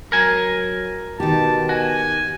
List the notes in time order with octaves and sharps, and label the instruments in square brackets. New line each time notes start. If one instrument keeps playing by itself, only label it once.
[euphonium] F#3 [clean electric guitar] A#4 G#5
[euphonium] B2 [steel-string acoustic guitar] D#3 G4 [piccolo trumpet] A5
[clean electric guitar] F#4 [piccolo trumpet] G#5